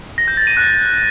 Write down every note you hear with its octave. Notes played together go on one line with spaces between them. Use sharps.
A#6
G6
A6
D#7
F#6